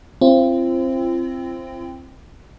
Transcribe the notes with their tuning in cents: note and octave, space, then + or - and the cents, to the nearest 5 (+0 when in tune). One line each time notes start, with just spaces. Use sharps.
C4 +10 F4 -40